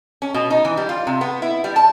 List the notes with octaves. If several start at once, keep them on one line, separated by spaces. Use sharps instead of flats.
C#4
B2
D#4
E3
G3
F4
C3
B3
E4
G3
A5